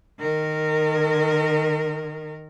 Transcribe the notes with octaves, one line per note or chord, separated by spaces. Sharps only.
D#3 A#4